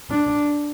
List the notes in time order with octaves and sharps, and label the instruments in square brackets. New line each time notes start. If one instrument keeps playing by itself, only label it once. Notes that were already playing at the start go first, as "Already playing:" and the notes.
[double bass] D4